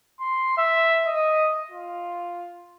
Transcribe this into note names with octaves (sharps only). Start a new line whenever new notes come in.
C6
E5
D#5
F4